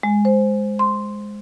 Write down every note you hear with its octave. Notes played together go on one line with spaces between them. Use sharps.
G#3
C5
C6